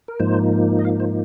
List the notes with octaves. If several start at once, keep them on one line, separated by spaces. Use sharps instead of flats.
A#4
G#2 F3 A#3 D#4 C5
D#5
F5
C5